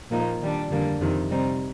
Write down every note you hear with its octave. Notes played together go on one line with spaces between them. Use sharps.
A#2 F3 A#3 D#4
D#3 G3 D4
F2 D3 G3 A#3 D4
F2 C3 D#3
C3 G3 C4 D#4